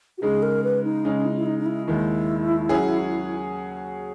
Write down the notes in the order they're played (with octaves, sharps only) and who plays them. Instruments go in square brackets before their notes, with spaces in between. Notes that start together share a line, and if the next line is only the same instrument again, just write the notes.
[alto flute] F#4
[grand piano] C#3 G#3 D#4 [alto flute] G#4
[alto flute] A#4
B4
D#4
[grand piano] C#3 G#3 D#4 [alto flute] C#4
[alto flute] E4
E4
D#4
D#4
E4
[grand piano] D#2 D#3 G#3 [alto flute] E4
[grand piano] F#3 C#4 G#4